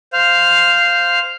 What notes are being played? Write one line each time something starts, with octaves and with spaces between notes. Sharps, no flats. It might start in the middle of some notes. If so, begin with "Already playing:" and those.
C5 F5